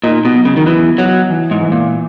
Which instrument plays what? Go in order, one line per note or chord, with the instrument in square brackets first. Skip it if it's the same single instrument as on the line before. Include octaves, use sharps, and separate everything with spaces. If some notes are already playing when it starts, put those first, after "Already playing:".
[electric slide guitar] A#2 [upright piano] D#4
[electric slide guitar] B2
[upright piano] F#3
[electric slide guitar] C#3
D#3
[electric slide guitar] E3 [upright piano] B3
[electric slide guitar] F#3 [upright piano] B3
[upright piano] E3
[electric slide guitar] G#2
[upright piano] E3
[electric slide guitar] A#2